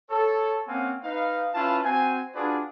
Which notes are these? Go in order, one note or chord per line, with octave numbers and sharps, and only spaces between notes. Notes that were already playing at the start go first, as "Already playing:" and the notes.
A4 C#5
A#3 C4 C#4 F5 F#5 G#5
D#4 B4 F5
C#4 E4 F4 B4 F5 A5
C4 F#4 C5 G#5
D4 F4 F#4 G#4 B4 D5